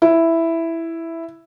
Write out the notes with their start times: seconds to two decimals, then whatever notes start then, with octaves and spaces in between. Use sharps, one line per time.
0.02 E4